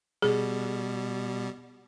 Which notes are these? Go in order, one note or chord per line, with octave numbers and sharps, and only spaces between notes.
B2 G3 G#4